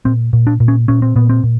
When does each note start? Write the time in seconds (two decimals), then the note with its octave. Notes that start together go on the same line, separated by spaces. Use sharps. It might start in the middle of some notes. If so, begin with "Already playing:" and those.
0.05 A#2 C4
0.33 A#2
0.47 D4
0.60 A#2
0.68 C#4
0.88 A#2 C#4
1.02 C4
1.16 A#2 B3
1.30 C4
1.43 A#2